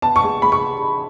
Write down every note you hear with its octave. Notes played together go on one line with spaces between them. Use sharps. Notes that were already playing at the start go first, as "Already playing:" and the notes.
B3 A5
C#6
G#3
G#3 B5
C#6